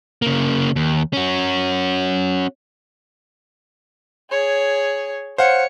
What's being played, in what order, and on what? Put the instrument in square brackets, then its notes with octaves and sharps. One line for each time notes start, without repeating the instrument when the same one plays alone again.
[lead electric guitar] C#3 A#3
D#2
C#4 F#4
[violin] G#4 C#5
[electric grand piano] C5 F5 F#5 [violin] C#5 C#7